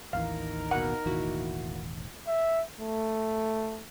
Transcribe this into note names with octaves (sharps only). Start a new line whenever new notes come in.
A1 D#2 E3 D#4 A#4 F5
B2 A#3 F#5
E1 A1 D#3 A#3 E4 F#4
E5
A3